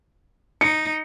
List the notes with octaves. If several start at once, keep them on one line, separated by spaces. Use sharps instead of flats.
D#4 C#7